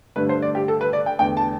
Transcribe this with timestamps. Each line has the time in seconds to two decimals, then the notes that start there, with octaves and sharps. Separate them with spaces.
0.16 G2 D3 A3 B4
0.29 C5
0.42 D5
0.55 G4
0.68 A4
0.81 B4
0.93 D5
1.06 G5
1.19 E2 D3 A3 G5
1.37 A5